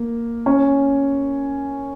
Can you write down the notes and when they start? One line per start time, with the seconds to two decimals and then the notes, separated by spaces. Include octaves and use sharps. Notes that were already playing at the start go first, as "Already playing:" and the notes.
Already playing: A#3
0.46 C#4